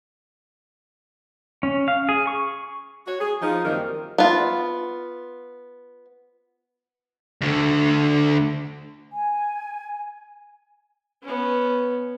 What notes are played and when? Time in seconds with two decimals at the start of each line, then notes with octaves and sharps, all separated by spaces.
1.63 C#4
1.88 F5
2.09 G#4
2.27 C#6
3.07 F#4 C#5
3.20 G#4
3.42 F3 D#4
3.65 F#2 D#3 G3 A#3 C4 A#4
4.18 B3 F4
7.41 D2 D3
9.12 G#5
11.23 B3 C#4